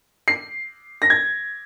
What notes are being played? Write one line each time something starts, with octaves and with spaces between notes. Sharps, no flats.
C7
A#6
G#6